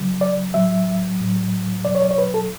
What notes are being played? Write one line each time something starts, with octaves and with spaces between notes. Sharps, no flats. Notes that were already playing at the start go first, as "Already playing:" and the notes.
Already playing: C#3 F#3
D5
A2 F#3 E5
A2 F#3
B2 F#3 D5
C#5
D5
C#5
B4
A4